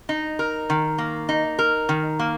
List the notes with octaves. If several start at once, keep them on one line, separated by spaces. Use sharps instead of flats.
D#4
A#4
D#3
A#3
D#4
A#4
D#3
A#3